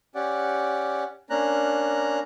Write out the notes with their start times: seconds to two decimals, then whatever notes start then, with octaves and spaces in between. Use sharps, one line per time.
0.15 C#4 G4 D5 F#5
1.30 A#3 C#4 D4 A#5 F#6